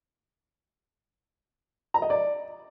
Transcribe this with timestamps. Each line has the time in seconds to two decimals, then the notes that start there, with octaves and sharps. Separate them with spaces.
1.94 A#5
2.02 D#5
2.10 D5